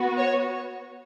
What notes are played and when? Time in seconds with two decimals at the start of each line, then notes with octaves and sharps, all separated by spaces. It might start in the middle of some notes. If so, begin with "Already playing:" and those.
Already playing: B3 F#4
0.17 C#5